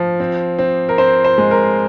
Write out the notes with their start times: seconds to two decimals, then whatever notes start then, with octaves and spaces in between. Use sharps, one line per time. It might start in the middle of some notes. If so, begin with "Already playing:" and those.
Already playing: F3
0.20 C4
0.59 C4
0.89 A#4
0.98 C4 C5
1.24 C5
1.38 G#3
1.51 A#4